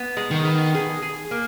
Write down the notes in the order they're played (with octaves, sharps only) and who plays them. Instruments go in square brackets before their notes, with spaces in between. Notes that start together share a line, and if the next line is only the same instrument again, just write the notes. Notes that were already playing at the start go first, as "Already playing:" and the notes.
Already playing: [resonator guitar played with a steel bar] B3
G#3
[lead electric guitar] D#3
[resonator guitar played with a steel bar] B3
G#4
G#4
A#3